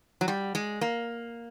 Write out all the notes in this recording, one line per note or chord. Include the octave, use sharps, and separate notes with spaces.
F#3
G3
G#3
A#3